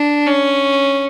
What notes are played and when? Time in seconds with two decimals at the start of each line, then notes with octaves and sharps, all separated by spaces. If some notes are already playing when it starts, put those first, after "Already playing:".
Already playing: D4
0.27 C#4